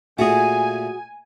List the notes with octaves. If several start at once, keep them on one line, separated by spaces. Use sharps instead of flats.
A#2 A3 F#4 G#4 G#5